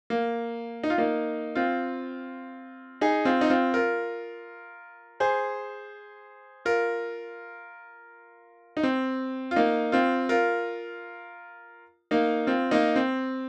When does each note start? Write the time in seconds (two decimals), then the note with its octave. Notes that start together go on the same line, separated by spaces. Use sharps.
0.10 A#3
0.83 D#4
0.90 F4
0.98 A#3 D#4
1.55 C4 F4
3.01 D#4 G#4
3.25 C4 F4
3.41 D#4
3.50 C4 F4
3.74 F4 A#4
5.20 G#4 C5
6.65 F4 A#4
8.77 D#4
8.83 C4
9.51 F4
9.56 A#3 D#4
9.92 C4 F4
10.29 F4 A#4
12.11 A#3 D#4
12.47 C4 F4
12.71 A#3 D#4
12.96 C4